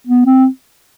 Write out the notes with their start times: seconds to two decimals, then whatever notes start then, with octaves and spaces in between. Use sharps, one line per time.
0.07 B3
0.26 C4